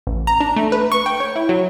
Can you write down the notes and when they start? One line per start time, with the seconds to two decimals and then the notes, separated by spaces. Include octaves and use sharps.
0.07 A1
0.27 A#5
0.41 D4
0.56 A3
0.72 B4
0.92 C#6
1.06 G5
1.20 C#5
1.36 E4
1.49 F#3